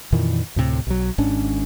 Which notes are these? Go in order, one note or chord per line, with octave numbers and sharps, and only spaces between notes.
F2 A#2 D#3 E3
D2 A2 C3
B1 F#3
G#1 G#2 C#4 D4